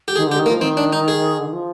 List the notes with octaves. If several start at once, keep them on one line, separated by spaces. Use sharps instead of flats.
G4
D#3 G#4
D3 G4
D#3
A#3
F3
D#3 C4
D4
D#4
G#4
D3
D#3
F3